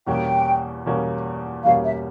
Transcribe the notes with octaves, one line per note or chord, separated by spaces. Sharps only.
E2 B2 G3 A#3 C#4 G5
E2 B2 G3 A#3 C#4
E2 B2 G3 A#3 C#4 F5
E5